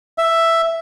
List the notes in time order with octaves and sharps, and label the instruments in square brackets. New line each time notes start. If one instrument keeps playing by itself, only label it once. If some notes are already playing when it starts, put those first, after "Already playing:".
[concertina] E5